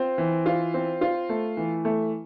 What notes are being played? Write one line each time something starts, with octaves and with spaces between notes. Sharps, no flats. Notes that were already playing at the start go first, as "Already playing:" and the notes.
Already playing: C4 F4
E3
F4
C4
F4
A3
E3
A3